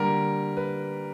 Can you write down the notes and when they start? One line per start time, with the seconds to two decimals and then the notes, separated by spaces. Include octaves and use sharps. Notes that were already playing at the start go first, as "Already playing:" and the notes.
Already playing: D3 G3 A#3 A#4
0.57 B4